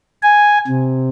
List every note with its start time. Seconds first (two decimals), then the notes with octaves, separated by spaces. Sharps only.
0.22 G#5
0.68 C3